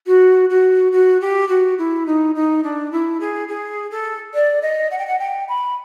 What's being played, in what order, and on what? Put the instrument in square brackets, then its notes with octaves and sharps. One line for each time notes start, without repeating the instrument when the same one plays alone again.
[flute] F#4
F#4
F#4
G4
F#4
E4
D#4
D#4
D4
E4
G#4
G#4
A4
D5
D#5
F#5
G5
F#5
G5
B5